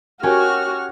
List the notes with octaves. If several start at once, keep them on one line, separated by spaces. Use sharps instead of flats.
C#4 F#4 G4 A#4 C#5 G#5 F6